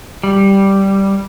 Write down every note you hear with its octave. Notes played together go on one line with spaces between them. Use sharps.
G3